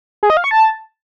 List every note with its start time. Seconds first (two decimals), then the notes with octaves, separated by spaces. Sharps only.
0.23 G#4
0.30 D#5
0.37 F5
0.44 C#6
0.51 A5